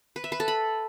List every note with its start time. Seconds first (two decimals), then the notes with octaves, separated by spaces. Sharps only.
0.16 B4
0.24 E5
0.32 B4
0.40 A4
0.48 B5